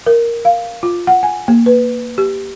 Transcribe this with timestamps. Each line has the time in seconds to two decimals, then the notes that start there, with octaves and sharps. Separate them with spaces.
0.06 A#4
0.45 F5
0.83 F4
1.07 F#5
1.23 G#5
1.48 A#3
1.66 B4
2.18 G4